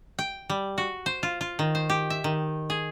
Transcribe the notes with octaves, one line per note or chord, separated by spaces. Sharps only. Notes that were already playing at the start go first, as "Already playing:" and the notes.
G5
G3
F#4
C5
F4
F4
D#3
C5
G4
E5
D#3
G#4